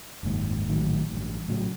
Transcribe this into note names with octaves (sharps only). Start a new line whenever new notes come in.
F#1 D#2 G#2
A#1 A2 D#3 F#3
A1 G2
A2 C#3 F#3